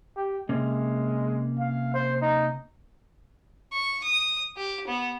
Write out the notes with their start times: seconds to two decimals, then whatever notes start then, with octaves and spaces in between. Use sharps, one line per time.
0.16 G4
0.49 C3 G#3 A#3 C#4
1.59 F5
1.94 C5
2.22 D#4
3.73 C#6
4.04 D#6
4.57 G4
4.87 B3